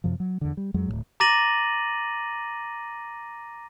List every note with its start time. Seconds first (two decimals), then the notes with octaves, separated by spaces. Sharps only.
0.04 F#2 C3 F3
0.20 F#3
0.41 E2 D3
0.57 G3
0.74 F2 F#3 G#3
0.88 D1 E2 A2
1.20 A#5 D6 A6 A#6 D#7 F#7